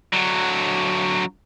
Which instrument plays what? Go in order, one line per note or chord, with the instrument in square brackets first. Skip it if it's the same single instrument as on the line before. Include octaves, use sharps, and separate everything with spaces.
[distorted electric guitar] D3 F#3